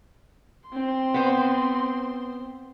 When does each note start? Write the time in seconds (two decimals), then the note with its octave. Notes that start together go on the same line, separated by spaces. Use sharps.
0.69 C4 C6
1.14 B3 C5